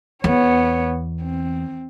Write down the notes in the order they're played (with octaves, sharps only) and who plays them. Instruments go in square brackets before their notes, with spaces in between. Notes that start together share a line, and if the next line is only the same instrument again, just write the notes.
[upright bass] E2 [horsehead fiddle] B3 C#5
[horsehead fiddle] C4